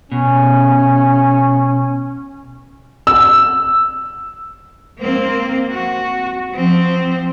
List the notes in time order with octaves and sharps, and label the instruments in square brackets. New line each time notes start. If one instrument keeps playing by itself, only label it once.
[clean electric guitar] B2 [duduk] C#4
[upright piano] E6
[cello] A#3 C4
F#4
F3 C4